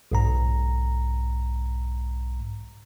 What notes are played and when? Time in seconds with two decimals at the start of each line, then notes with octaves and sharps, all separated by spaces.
0.12 B1 G#2 A#5